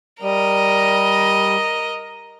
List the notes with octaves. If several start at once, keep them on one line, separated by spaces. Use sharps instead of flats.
G3 A#4 D#5